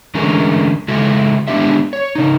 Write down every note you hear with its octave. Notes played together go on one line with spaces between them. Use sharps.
D3 E3 G#3 A3 C#4 A#4
C#3 G#3 E4 F#4 A4
G#3 B3 D4 E4 G4 E5
C#5
C#3 D#4